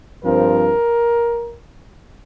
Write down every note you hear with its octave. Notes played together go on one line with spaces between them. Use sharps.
G2 F3 C4 A#4